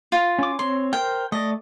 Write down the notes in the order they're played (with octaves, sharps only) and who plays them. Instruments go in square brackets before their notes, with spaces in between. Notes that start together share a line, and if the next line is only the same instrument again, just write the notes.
[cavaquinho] F4
[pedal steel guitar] C#4 D6
[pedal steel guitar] C4 C#5 [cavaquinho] C6
[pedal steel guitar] A#4 C5 [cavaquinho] G5
[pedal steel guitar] A3 D5 [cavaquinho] D#5